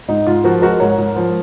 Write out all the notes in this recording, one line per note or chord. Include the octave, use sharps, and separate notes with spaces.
G#2 D#4
G#2 F4
F3 F#4 A#4
G#3 F#4 A#4
G#2 A#4 C#5
G#2
F3